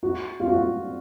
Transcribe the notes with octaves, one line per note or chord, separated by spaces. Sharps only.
F#4
F4
F#4
F4